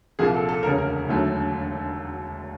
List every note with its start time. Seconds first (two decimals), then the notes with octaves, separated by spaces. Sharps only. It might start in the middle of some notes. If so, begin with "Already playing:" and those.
0.19 C2 A#2 F3 A#3 G#4
0.34 A4
0.49 A4
0.63 E1 D2 C#3 A#4
0.78 A#4
1.08 E1 D#2 D3 F#3 A3